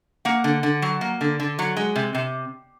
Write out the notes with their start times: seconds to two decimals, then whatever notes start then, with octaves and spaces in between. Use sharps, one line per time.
0.25 A#3 F#5
0.44 D3
0.63 D3
0.82 F#3
1.01 A#3
1.21 D3
1.40 D3
1.59 F#3
1.77 G#3
1.96 C3
2.15 C3